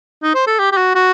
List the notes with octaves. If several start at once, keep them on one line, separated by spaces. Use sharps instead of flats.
D#4
C5
A4
G4
G4
F#4
F#4